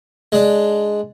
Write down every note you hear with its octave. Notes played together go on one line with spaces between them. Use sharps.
G#3 D4